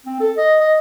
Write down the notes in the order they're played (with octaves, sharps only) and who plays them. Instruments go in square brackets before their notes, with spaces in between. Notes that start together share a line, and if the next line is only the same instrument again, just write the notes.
[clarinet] C4
A4
D#5
D#5